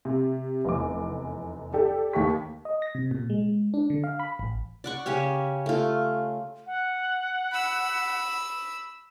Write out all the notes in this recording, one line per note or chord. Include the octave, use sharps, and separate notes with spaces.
C3
F1 E2 D6
G4 A4 D5
D#2 G4 C#6 B6
D#5
A#6
C3
A#2
G#3
D4
D3
F5
B5
A1
D5 F#5 C#6
C#3 C#4 G4 C#5
A3 F4
F#5
B5 E6